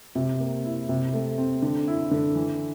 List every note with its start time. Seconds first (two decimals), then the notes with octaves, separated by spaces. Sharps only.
0.15 C3
0.40 A#3
0.64 E4
0.89 C3
1.14 A3
1.38 C4
1.62 D3
1.87 E4
2.11 D3
2.35 E3